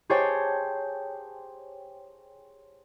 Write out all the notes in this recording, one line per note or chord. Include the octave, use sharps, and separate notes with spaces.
G4 G#4 C5 C#5 G5 A5